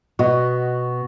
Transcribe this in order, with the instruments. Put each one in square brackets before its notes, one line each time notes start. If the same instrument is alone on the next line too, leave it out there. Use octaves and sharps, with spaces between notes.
[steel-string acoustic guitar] B2 B3 D#5 [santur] F#4